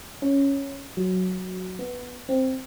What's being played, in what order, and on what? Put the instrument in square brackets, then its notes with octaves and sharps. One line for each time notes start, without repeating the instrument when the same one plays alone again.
[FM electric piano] C#4
F#3
B3
C4